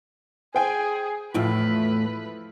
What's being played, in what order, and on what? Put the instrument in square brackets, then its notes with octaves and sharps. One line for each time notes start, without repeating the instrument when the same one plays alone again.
[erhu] G#4 [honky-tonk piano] C5 G5 G#5
[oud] E2 A2 [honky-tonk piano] F3 E4 F4 [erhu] B4